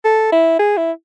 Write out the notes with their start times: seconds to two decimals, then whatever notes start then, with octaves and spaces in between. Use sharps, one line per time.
0.05 A4
0.32 E4
0.59 G#4
0.77 E4